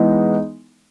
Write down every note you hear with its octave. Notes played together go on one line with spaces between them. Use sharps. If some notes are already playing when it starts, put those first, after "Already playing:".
Already playing: E3 G#3 B3 D#4